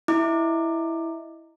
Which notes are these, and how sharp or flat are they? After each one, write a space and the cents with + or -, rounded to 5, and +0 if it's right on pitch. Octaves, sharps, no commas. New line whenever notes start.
E4 +0 D#5 +0 D6 +15